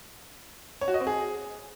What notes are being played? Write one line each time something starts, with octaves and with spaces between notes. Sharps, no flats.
C#5
F#4
D#5
C4
G#4